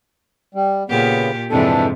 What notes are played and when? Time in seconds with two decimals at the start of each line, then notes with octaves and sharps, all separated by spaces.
0.55 G3
0.89 A#2 C#3 B3 G4
1.51 F2 G#2 C3 E3 D4 A4